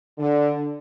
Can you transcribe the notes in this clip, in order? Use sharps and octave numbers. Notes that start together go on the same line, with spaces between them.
D3